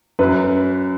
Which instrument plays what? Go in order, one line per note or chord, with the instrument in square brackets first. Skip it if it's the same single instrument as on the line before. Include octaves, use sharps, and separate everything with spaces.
[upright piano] F#2 B4